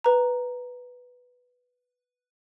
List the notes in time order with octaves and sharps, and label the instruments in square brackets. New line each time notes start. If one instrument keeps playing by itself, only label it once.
[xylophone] B4 A#5